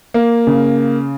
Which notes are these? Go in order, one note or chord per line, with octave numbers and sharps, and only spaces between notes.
A#3
C#3